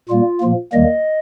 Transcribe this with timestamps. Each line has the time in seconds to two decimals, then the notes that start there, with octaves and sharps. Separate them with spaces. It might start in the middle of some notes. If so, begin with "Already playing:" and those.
0.09 A#2 G3 A#3 F4
0.41 A#2 F3 A#3
0.73 D#2 D#3 G3 A#3 D#5